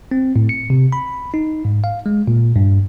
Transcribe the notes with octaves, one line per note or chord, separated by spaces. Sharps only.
C4
A2
C#7
C3
B5
D#4
G#2
F5
G#3
A#2
G2